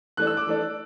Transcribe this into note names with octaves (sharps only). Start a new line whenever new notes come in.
E3 A3 D4 F#6
E6
D6
E3 A3 D4